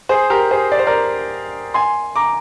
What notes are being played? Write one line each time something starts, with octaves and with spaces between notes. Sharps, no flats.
G#4 C5
G4 A#4
G#4 C5
D5
C5
A#4 D5
G#5 C6
A#5 D6